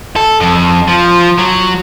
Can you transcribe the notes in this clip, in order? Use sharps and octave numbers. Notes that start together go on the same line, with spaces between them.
A4
F2
F3
F#3